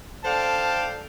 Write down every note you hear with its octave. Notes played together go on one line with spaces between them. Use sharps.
D4 A4 C5 F5 G5 A5